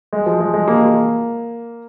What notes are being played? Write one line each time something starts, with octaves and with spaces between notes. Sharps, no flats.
G#3
F3
G#3
G#3
A#3
A#3